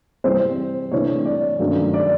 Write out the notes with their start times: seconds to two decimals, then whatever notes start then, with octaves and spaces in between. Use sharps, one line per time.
0.24 C3 E3 G3 C4 C5
0.92 C3 E3 A3 D4 C#5
1.25 D5
1.59 G2 D#3 F#3 A3 C#4
1.94 D5